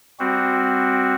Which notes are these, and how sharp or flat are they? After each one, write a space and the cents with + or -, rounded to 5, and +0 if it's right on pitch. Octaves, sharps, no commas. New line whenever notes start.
G3 +20 C4 +0 F#4 +0